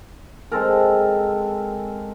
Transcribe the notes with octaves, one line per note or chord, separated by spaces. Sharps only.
G#3 C4 A4 A#4